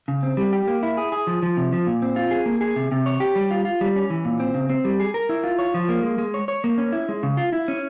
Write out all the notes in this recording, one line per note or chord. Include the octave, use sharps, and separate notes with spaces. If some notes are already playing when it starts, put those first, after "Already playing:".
C#3
C4
G3
G4
A#3
E4
G#4
G#4
F3
F3
C3
F3
A#2
C4
F4
G#4
A#3
G#4
C3
C3
C#5
G4
G3
F4
F4
G3
C#4
E3
A#2
C4
C#3
C4
G3
G#4
A#4
E4
F4
C#5
F3
A#3
G#3
G#3
C#5
C#5
A#3
C#4
E4
G#3
C#3
F4
E4
C#4